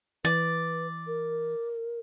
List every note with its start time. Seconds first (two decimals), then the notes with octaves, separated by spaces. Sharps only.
0.25 E3 B4 D5
1.07 A#4